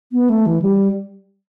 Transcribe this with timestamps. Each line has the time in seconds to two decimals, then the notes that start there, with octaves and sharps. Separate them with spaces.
0.12 B3
0.30 A3
0.46 E3
0.62 G3